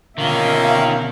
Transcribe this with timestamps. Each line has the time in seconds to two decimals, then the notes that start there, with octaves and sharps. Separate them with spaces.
0.18 B2 D3 D#3 A#3 C#4 F4 E5